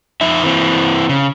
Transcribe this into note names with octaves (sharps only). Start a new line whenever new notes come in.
F2 D#4 E5
E3 C4
C#3